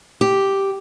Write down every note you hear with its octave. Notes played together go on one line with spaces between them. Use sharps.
G4